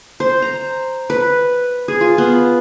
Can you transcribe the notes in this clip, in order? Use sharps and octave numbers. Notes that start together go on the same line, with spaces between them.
C5
A#5
B4
G#4
F4
B3